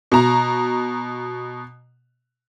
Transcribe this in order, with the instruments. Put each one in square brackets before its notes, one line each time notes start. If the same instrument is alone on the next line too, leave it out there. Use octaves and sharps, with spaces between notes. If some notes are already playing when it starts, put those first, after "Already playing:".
[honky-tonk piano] B2 A#5